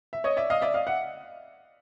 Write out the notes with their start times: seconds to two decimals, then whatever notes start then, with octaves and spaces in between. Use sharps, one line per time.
0.13 E5
0.24 C#5 D#5
0.37 D5 E5
0.50 D#5 F5
0.62 D5 E5
0.74 D#5 F5
0.87 E5 F#5